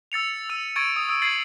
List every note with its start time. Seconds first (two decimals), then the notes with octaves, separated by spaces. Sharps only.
0.12 E6 A6 C#7 F7
0.50 E6 D#7 F7
0.76 C#6 G#6 A6 D7 D#7
0.96 D#6
1.09 D#6 E6 D7
1.22 G#6 A6 C7 D#7 F#7